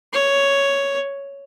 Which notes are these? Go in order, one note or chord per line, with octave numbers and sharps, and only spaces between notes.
C#5